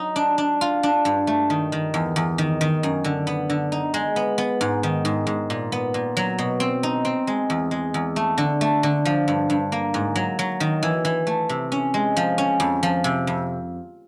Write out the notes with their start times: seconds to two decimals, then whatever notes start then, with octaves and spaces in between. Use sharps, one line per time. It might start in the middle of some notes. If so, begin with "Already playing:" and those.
Already playing: F#3 D#4
0.16 D4
0.38 D4
0.61 F4
0.83 D4
1.05 G2
1.27 A3
1.50 D#3
1.72 D#3
1.94 E2
2.16 E2
2.38 D#3
2.61 D#3
2.83 F#2
3.04 D3
3.27 B3
3.50 D3
3.72 D#4
3.94 G#3
4.16 B3
4.38 B3
4.61 G#2
4.83 D#3
5.05 G#2
5.27 G#2
5.50 A#2
5.72 B3
5.94 A#2
6.17 F#3
6.38 B2
6.60 C4
6.83 D#4
7.05 C4
7.27 G#3
7.50 E2
7.71 G#3
7.94 E2
8.16 A3
8.38 D3
8.61 A3
8.83 D3
9.05 F3
9.28 G2
9.50 G2
9.72 A#3
9.94 G#2
10.15 F#3
10.39 F#3
10.60 D#3
10.83 E3
11.05 E3
11.27 A3
11.49 C3
11.72 C#4
11.94 G#3
12.17 F3
12.38 C#4
12.60 F2
12.83 F3
13.04 C3
13.27 F2